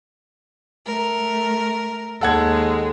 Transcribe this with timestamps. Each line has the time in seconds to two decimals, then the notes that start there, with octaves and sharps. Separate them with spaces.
0.85 A3 A#4
2.21 D#2 G#3 A4 F#5 G#6